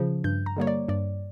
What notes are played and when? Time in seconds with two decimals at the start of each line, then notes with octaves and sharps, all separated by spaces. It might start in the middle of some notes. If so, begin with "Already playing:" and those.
Already playing: C#3 F3
0.24 G2 G6
0.46 A#5
0.57 D3 G3 A#3 C#5
0.67 D5
0.88 G2 D5